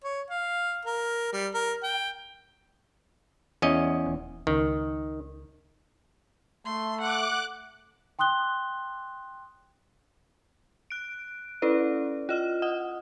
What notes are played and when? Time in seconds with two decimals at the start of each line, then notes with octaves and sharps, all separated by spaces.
0.04 C#5
0.30 F5
0.85 A#4
1.32 G3
1.54 A#4
1.83 G5
3.62 E2 C#4 D#5
4.06 D#1
4.47 C#2 D#3
6.66 A3 C6
7.01 F#5 D6 F#6
8.19 G5 C6 D#6 F#6 G7
10.90 F#6 D7
11.62 C#4 E4 A4 B4 D5
12.29 F4 D#5 F6
12.62 D#5 F#5 D#6